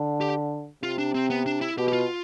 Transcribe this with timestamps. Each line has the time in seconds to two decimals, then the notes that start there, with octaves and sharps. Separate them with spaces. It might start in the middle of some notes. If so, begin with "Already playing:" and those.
Already playing: D3
0.21 G4
0.83 C3 F4
0.98 D4
1.15 C4
1.30 B3
1.46 D4
1.61 E4
1.77 B2 G4
1.88 G4
1.93 F4